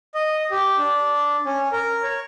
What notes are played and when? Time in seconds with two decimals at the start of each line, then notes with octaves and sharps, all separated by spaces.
0.14 D#5
0.51 G4
0.78 D4
1.46 C#4
1.72 A#4
2.03 C#5